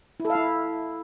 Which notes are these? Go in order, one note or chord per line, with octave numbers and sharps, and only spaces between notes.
E4
A4
F5
E4